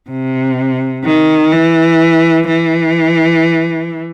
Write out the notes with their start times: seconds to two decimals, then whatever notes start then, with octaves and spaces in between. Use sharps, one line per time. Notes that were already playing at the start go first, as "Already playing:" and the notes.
0.10 C3
1.05 D#3
1.52 E3
2.48 E3